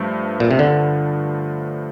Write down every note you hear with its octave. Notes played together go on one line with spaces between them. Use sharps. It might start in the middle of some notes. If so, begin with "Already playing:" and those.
Already playing: G2 F3 A3
A#2
C3
D3